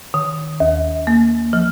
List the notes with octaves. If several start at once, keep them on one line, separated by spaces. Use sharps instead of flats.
D#3
D#2
A#3
F3